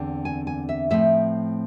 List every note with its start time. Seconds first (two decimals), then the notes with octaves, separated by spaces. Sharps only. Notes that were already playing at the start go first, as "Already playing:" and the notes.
Already playing: E2 D3 C4
0.25 G#5
0.47 G#5
0.69 E5
0.90 A2 F3 A3 C4 E5